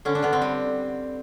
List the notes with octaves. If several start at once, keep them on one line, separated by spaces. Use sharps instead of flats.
D3 C#4
D4
D3 B3
C4
G3